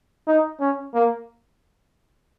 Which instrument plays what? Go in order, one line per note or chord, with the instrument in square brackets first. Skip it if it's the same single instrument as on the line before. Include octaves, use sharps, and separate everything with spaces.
[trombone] D#4
C#4
A#3